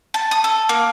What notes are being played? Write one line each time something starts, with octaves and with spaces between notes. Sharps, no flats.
A5
D#6
A4
A#3